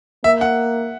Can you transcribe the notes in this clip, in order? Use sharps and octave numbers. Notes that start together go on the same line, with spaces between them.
A#3 E5
F#5